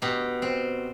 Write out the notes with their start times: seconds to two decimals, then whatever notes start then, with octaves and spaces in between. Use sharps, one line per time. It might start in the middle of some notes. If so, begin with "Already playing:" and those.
0.02 B2 G4
0.42 C4